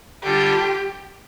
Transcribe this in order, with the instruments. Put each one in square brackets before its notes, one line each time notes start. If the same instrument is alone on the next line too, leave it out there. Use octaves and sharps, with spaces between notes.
[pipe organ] D3 G3 D4 F4 [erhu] G4